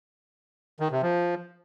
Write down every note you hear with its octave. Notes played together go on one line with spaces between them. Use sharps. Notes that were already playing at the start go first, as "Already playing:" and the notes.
D#3
C3
F3